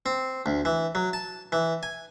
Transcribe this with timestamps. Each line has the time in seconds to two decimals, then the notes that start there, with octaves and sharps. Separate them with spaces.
0.06 C4
0.46 D2
0.65 E3
0.95 F#3
1.13 A5
1.52 E3
1.83 G#5